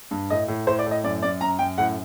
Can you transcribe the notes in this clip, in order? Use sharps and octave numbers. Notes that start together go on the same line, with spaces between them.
G2
A2 D#5
A2
A2 C5
D5
A2
D#5
F#2 D5
F#2 D5
F#2 A#5
F#2 G5
A2 F#5